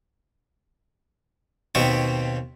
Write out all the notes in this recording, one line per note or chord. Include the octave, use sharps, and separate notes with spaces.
D#2 B2 B3 C4 C#6